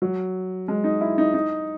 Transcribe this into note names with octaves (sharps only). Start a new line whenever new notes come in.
F#3
G#3
D#4
E4
D#4
D#4